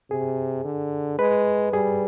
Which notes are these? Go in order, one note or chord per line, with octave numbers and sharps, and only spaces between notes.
C3 G#4
D3
G#3 B4
G3 G#4